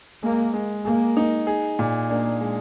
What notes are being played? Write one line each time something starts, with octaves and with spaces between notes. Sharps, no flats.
G#3 A#3
G#3
A#3 G#4
D#4
G#4
A#2
A#3 D4
G#3